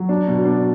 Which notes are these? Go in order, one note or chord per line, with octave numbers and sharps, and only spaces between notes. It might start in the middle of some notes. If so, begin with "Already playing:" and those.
Already playing: F#3
D4
B2
D4